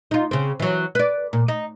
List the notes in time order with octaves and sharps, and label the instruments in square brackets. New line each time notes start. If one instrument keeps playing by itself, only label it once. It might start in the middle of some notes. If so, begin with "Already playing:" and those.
[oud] D#4 F4
C#3 C4
E3 F#3
B4 D5
A#2
D#4